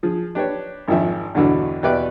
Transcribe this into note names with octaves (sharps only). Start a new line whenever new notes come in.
F3 G#4
D4 G4 B4 C#5
G#1 F2 D#3 F3 E5
E2 G2 B2 D3 E3 F#3
E2 B2 G4 B4 D5 E5